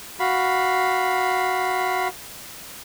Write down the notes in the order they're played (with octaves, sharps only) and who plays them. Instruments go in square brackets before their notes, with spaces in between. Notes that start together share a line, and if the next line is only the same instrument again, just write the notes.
[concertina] F#4 F5 B5